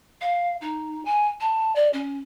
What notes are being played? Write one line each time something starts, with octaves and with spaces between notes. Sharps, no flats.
F5
D#4
G#5
A5
D5
C#4